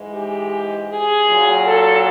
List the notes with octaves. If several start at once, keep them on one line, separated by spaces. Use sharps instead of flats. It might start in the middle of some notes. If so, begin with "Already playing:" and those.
Already playing: G#2 E3 G#3
G4
G#4
A#2 F#3
A4